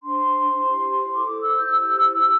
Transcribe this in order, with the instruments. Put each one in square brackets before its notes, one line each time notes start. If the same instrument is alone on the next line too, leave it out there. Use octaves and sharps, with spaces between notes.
[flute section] D4 C5 C6
E4 G4 C5
E4 A4 C5 D6
E6
G6
E4 G4 C5 E6